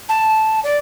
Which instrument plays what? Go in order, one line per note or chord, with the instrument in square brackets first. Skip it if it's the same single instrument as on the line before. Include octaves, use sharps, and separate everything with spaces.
[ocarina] A5
D5